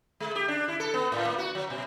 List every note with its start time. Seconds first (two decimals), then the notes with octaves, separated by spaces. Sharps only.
0.20 G#3
0.35 G4
0.48 D4
0.68 E4
0.80 A4
0.94 B3
1.12 A2
1.25 A#3
1.38 F#4
1.55 F#3
1.70 B2